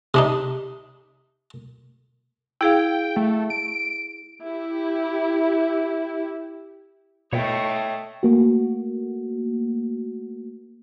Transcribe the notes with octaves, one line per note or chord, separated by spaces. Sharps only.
C3 D4 D#4
E4 G#4 F5 G5
A3
D7
E4 G4
B2 A3 C#5 D#5 E5 G5
A3 A#3 F#4